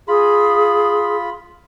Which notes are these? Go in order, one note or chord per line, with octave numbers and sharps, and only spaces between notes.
F4 G#4 B5